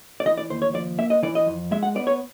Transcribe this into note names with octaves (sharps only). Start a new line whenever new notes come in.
D5
E3 D#5
D5
D#2 C5
C#5
F3 D5
A#3 E5
D#5
E3 D5
D#5
F2
G#3 E5
F#5
B3 D5
C#5